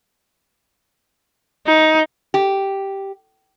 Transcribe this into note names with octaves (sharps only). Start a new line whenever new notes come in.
D#4
G4